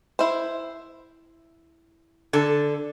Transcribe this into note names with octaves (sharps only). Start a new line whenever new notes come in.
E4 C5
D3 A4